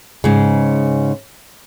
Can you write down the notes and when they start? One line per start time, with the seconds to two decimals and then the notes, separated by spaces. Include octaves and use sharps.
0.24 G#2 C#3